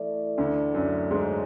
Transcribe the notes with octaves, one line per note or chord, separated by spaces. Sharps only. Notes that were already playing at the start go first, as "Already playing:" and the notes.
Already playing: E3 A3 E4 A4 D5
D2 D3
F#2 F#3
G#2 G#3